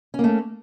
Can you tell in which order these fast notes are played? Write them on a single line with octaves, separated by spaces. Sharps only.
C#4 A#3 A3